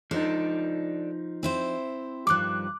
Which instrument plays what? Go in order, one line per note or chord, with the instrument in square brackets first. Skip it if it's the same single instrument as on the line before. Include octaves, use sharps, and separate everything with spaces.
[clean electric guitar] F3 D#4 [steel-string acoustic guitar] D4 A4 D5
[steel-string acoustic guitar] C4 E4 C5
[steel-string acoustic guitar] G2 D#3 F3 [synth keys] D6 F#6